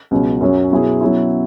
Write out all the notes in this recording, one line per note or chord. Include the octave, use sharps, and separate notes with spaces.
C#2 B2 F#3
F#2 F#3 C#4
B2 F#3 E4 G#4
B2 F#3 C#4 E4